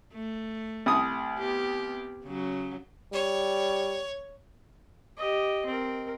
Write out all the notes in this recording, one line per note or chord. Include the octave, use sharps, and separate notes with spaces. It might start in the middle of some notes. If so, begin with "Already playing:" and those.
A3
C2 D#6
B3 G4
C#3 F#3
G3 C#5
G4 D#5
C4 A#4